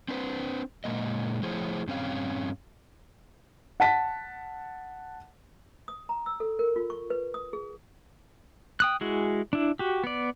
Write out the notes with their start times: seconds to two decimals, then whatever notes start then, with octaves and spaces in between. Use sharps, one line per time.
0.08 C4 D4 B4 C5
0.84 A#2 G#3 A#3 D#5
1.43 F3 A3 E4 G#4 C5 C#5
1.87 G2 C4 C#4 F5
3.80 F#5 A5 B6
5.88 D#6
6.09 A#5
6.26 E6
6.40 A4
6.59 A#4
6.76 F4
6.90 C#6
7.10 B4
7.34 D#6
7.53 G#4
8.80 G5 D#6 F#6
9.01 G#3 E4 F#4 G#4
9.53 D4 E4
9.79 F#4 G4
10.04 B3 D5